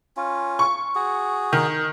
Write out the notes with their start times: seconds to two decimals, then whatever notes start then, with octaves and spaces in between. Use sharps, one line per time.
0.17 C#4 F4
0.59 C#6
0.95 F#4 G#4
1.53 D#3